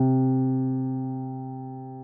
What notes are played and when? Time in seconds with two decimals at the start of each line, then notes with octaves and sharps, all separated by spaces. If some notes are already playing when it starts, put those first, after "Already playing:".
Already playing: C3